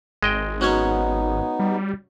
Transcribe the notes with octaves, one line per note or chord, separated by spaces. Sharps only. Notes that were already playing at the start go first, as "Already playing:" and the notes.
G#1 G#3 D#5 G5
F#3 B3 C#4 D#4 C#5
G3